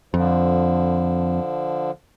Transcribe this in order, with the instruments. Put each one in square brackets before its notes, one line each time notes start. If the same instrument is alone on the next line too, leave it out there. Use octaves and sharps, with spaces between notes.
[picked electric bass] F2 [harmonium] D3 F3